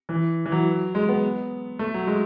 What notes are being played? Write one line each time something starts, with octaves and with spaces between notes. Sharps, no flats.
E3
E3
F#3
G#3
B3
A3
F#3
G#3